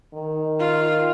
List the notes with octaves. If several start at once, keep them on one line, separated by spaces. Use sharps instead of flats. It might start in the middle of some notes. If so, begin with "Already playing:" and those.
D#3
F4